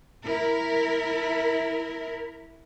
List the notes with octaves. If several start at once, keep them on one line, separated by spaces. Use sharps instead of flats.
E4 A#4